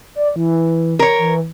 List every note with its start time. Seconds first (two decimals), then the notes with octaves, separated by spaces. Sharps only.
0.16 D5
0.36 E3
0.99 A#4 C#5
1.19 E3